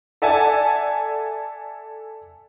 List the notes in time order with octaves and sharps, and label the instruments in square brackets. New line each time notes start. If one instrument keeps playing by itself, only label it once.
[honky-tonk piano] A4 D5 E5 F#5 G#5 A5